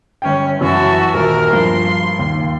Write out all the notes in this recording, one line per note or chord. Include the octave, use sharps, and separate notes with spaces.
G1 C#4 C#5 G5
F#2 E3 F#3 F#4 E5 A5
D#1 F#4 A#4 F6
G2 F3 C6
D#2